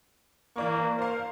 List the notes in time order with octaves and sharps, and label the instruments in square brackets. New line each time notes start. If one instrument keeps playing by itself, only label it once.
[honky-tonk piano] E3 D5 C#6 [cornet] A#3
[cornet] A#4 [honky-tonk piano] C5 F5